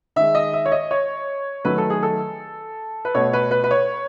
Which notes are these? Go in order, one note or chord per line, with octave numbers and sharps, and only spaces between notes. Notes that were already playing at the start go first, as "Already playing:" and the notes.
D#3 G#3 E5
D#5
E5
C#5
D#5
C#5
D#3 F#3 A3 B4
A4
G#4
A4
B4
B2 A3 C#5
B4
B4
B4
C#5